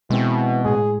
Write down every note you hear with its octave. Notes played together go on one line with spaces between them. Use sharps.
B2 E3 G#3 C4
A2 G#3 G#4